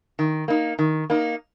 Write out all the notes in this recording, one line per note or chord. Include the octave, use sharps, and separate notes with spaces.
D#3
A#3 D#4
D#3
A#3 D#4